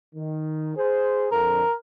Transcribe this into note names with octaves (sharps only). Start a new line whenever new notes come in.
D#3
G#4 C5
F2 D3 A#4